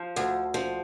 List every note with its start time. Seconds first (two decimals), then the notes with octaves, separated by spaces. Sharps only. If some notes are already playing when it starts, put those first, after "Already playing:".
Already playing: F3
0.16 D2
0.54 F3